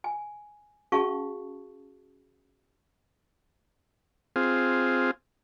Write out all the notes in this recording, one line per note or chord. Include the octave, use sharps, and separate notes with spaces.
G#5
C#4 F#4 G#4 F5 A5 C#6
C4 F4 G#4